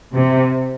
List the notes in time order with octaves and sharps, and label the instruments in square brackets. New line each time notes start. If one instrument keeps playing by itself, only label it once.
[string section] C3